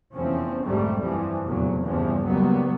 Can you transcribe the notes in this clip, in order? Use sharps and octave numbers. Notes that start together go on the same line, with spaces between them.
F1 E2 F3 C4 C#4
B1 F2 G#2 D3 G3 A3
G2 E3 F3 G3
F1 A#1 E2 A#2 C#3 F#3
E2 G2 C#3 E3 F3 G3
F#1 C#2 F#3 G3 A#3 B3